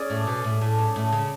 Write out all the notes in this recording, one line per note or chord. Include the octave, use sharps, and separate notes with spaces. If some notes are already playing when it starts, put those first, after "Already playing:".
Already playing: C#4 G#4 D5
A2
B2
A2
A2
G#2
A2
C#3